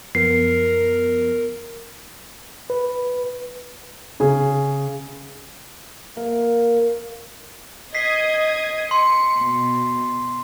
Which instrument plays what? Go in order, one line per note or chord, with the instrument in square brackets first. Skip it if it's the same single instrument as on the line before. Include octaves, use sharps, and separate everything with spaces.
[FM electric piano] F#2 F3 B3 [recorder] A#4 [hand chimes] C7
[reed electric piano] B4
[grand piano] C#3 G#4
[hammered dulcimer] A#3
[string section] D#5 D#6 G#6 [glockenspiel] B6 C7
[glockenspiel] C6 [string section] C#7
[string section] B2